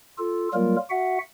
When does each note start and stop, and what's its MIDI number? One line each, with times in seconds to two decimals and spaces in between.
0.18 0.48 65
0.18 0.48 69
0.54 0.76 54
0.54 0.76 55
0.54 0.76 58
0.54 0.76 65
0.54 0.76 70
0.90 1.18 66
0.90 1.18 76
0.90 1.18 78